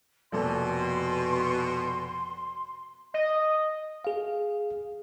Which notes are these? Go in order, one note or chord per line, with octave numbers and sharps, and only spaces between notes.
F1 B2 A#3 A4 C6
D#5
G#4 F5